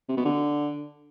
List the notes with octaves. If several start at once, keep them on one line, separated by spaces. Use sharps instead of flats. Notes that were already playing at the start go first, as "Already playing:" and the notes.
C3
B2
D3